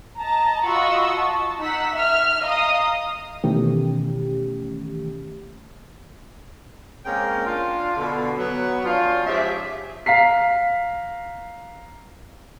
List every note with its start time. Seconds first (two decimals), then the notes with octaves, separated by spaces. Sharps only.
0.18 D#5 A5 A#5
0.65 F4 F#4 D#5 B5 C#6 E6
1.15 A5
1.61 D#4 F#5 E6 B6
1.93 E5 F6
2.44 D#5 F5 A#5 D#6
3.44 B2 D#3 E3 A3 C#4 G4
7.05 G#3 A#3 C4 C#4 A#4 G5
7.46 D4 F4
7.97 B2 D3
8.37 F#3 B3
8.85 F3 C#4 D4 F4
9.26 G#2 F3 C#4 G4 G#4 E5
10.06 F5 A#5 B6 C7